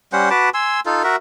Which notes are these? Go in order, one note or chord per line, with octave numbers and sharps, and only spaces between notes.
G3 C#4 C5 F#5
F#4 B4 A5 D6
G#5 C6 E6
D#4 F4 A4
F#4 A#4 E5